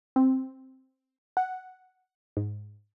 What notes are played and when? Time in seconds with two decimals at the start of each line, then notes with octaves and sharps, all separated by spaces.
0.16 C4
1.37 F#5
2.37 G#2